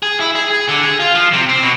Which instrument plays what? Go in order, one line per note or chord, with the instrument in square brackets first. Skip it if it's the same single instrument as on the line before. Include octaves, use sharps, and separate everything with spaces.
[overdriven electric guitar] G#4
E4
G#4
G#4
D3
G#4
F4
F3
C3
C4
B2